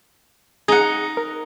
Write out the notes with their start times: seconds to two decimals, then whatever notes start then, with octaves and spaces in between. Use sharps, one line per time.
0.68 D#4 G#4 F#5
1.17 A#4